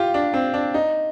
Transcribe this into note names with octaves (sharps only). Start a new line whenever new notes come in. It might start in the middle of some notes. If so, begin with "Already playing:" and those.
Already playing: F4 G4
D4
C4
D4
D#4